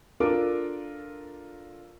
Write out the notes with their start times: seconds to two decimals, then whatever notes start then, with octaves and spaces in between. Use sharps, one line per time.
0.20 D4 F4 A4 A#4 D6